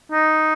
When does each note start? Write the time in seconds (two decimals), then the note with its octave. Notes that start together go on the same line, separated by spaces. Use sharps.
0.12 D#4